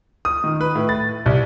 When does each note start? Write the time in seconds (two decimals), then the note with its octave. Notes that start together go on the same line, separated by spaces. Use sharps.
0.25 D#6
0.44 D#3
0.61 B4
0.76 A2
0.89 A6
1.26 C2